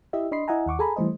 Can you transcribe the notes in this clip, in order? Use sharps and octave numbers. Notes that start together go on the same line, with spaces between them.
E4 G4 D#5 E5
D4 D#5 B5 C6 C7
E4 D#5 E5 F#5 G#5 A#5
D#2 F#5 C#6 D6
G#4 A4 G#5 A#5 B5
E3 G3 A3 C5 D#5